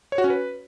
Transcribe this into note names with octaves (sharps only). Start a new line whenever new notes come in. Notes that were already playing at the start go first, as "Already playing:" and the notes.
C#5
F#4
C#4
B4